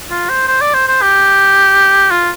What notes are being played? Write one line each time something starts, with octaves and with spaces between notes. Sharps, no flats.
F4
C5
C5
D5
C5
C5
G4
F4